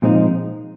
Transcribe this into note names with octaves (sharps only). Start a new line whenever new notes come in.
A#2 F3 G#3 C4 D#4